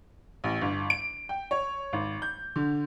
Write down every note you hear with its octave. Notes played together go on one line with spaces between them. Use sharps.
A1
G1
D7
G5
C#5
G#1
G6
D3